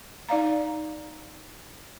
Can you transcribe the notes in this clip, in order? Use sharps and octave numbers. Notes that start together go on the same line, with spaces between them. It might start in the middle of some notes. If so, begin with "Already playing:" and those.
D#4 D5 F5 A#5